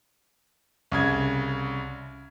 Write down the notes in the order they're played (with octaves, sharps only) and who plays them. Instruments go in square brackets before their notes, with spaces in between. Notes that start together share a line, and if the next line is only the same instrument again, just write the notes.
[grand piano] C2 C#3 G#6